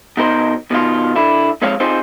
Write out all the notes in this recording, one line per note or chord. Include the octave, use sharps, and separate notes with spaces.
B2 D#4 A#4 C5
B2 D#3 F4
D3 E4
F2 G#3 C4 C#5 F5
C4 D#4 F4 G#4 C5